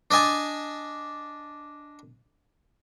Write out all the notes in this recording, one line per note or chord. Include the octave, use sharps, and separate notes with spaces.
D4 D5 D#5 G#5 A5